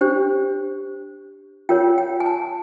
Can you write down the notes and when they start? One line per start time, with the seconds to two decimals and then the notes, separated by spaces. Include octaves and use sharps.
0.01 D4 G4 C5
1.69 F4 A#4 C#5 G5
1.98 G5
2.20 G#5
2.26 A5